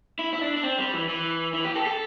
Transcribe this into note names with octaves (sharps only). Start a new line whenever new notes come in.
E4
E4
D4
D4
C4
G3
E3
E3
E3
G4
A4
G4
A4